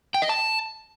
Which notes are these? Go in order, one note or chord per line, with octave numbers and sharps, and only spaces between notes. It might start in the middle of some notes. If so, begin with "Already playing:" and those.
G5
D#5
A5